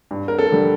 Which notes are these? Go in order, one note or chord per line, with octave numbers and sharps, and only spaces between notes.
G2
A#4
A4
D3 G3